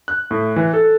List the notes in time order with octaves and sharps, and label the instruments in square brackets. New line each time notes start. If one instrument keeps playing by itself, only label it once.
[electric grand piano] F#6
A2
E3
A4